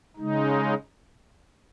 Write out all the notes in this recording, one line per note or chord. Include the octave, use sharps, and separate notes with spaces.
C#3 G#3 D#4